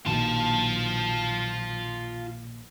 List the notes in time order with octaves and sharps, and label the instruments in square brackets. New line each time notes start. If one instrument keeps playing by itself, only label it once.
[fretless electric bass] A#1 B2 D#3 [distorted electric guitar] F4 A5